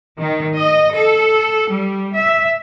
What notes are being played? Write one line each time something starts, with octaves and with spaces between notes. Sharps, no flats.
D#3
D#5
A4
G3
E5